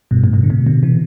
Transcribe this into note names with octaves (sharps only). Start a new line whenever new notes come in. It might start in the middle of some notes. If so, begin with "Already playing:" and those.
G2 B2
A2
G2 B2
D3
A2 C3
B2 D3
C3 E3